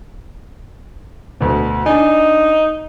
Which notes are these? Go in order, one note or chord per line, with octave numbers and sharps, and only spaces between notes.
D2 B2
D4 D#4 G#5